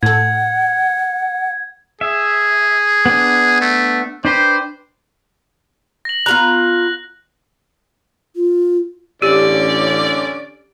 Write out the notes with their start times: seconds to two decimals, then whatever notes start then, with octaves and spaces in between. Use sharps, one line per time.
0.03 A2 A4 F#5 G#6
2.01 G#4 E5
3.06 B3 D4
3.62 A3
4.25 D4 B4 C5 G5
6.05 A#6 F#7
6.26 B3 F4 A#5 F#6
8.36 F4
9.22 A1 D3 C#4 G4 D5